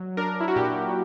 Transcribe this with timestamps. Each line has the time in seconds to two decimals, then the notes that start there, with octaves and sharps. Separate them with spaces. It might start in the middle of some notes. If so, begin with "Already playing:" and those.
Already playing: F#3
0.17 D4 A#4
0.41 E4
0.48 F#4
0.56 A#2 G4